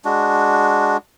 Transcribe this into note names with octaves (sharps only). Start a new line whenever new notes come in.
G#3 D4 F#4